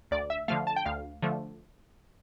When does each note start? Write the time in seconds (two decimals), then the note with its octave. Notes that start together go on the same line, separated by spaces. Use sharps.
0.11 D2 D5
0.30 E5
0.48 D3 F3 A3 F5
0.67 A5
0.76 G5
0.85 D2 F5
1.22 D3 F3 A3